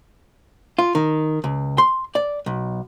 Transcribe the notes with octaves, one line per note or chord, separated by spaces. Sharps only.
F4
D#3
C#2
C6
D5
B1